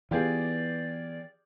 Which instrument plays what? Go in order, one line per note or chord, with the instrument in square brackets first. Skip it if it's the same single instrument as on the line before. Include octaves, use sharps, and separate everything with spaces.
[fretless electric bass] E3 B3 [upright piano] F4 G4 G#4 [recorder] D5